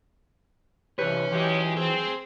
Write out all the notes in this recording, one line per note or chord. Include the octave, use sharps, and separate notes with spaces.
C3 E3 C#4 G4 B4 C#5
E3 F#3 G#3 G4
C4 G#4